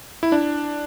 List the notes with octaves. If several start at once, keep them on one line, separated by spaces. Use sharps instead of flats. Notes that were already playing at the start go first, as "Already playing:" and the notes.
E4
D4